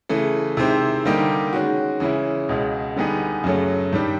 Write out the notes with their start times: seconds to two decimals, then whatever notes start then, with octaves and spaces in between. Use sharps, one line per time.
0.09 C#3 E3 A3
0.57 C3 D#3 G#3 C4 E4
1.05 D3 G3 A#3 D#4 G4
1.53 D#3 G#3 C#4 F#4
2.00 C#3 E3 G#3 C#4 E4
2.49 C#2 B2 G#3
2.96 D3 G3 B3 D#4 G#4
3.44 F#2 C#3 F#3 A3 C#4
3.93 G2 D#3 G3